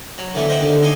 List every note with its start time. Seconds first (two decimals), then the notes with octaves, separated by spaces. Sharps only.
0.18 F#3
0.34 D3 E3 A3 B3
0.49 C5 D#5 E5 F#5 G5
0.60 D#2 D3
0.82 D#4 A4 D#5 G#5 C6 D6